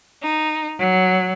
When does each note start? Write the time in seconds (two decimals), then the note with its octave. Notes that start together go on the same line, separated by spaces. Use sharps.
0.22 D#4
0.79 F#3